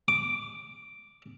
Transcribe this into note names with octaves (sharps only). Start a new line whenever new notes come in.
D6